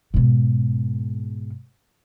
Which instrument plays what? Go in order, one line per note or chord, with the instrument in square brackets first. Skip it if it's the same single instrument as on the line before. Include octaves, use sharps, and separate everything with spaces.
[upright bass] G#2 B2